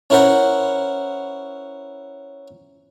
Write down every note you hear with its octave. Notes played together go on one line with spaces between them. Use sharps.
C#4 E4 A#4 C5 F#5